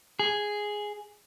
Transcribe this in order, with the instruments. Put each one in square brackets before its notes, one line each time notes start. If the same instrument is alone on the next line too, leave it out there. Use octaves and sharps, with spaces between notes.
[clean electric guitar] G#4